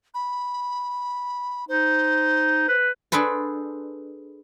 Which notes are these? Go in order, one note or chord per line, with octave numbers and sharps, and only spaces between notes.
B5
D#4 C5
B4
D4 G#4 A4 B4 C5